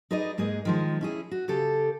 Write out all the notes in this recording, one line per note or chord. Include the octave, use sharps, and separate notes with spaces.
D#4 G#4 B4 D5 D#5
G#2 G#3 A#3 G#4 D#5
D#3 F3 G#3
C#4 E4 G#4
F#4
C#3 G4 A4